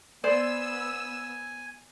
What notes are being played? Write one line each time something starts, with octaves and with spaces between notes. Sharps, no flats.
B3 C5 D5 G#5 E6